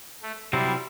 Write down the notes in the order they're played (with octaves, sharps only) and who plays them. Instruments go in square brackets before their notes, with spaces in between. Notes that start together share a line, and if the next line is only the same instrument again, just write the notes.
[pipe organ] A3
[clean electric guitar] C3 F#3 C4 E4 [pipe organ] G3